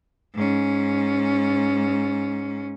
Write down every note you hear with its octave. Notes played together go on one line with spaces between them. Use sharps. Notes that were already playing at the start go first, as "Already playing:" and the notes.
G#2 C#4